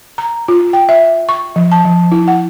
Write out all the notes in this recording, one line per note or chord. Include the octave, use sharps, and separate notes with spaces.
A#5
F4
G5
E5
C#6
F3
A5
F3
E4
F#5